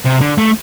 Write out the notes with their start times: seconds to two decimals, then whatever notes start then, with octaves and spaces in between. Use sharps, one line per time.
0.05 C3
0.21 D3
0.38 A3